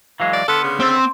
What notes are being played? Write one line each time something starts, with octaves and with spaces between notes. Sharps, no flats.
E3 F#3 G#3 F5
D5
D3 B3 A4 C6 F6 F#6
C#3
C4 C6 E6 A6
C6